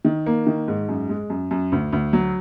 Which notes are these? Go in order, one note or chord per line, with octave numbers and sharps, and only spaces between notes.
D#3
A#3
D#3
G#2
F#2
G#3
F#2
F#2
D2
D2
F#3